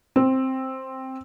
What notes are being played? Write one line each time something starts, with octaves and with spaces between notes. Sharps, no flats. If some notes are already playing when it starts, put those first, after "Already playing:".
C4